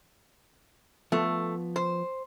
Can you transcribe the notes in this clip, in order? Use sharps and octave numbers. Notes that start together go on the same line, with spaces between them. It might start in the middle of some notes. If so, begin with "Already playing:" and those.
F3 A3 B3
C5